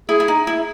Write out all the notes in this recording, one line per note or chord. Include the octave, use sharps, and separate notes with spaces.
E4 G#4
E4
D#4
E4